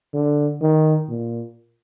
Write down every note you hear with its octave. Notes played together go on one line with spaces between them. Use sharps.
D3
D#3
A#2